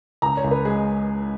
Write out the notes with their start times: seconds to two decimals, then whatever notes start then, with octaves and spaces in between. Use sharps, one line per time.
0.22 C#2 A#5
0.37 C#5
0.44 C#2
0.51 B4
0.65 G#3 G#4